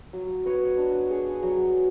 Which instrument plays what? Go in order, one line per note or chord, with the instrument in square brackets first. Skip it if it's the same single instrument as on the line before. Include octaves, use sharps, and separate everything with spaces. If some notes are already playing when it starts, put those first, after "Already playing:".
[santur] F#3
B3 F#4 C#5
D4
G#4 C#5
F#3